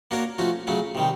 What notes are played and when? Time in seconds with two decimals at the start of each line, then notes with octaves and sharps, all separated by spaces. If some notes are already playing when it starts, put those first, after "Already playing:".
0.11 A#3 D4 F#4 A#4 C#5
0.38 F3 A3 C#4 F#4
0.67 C#3 F#3 A3 C#4
0.95 C3 D#3 G3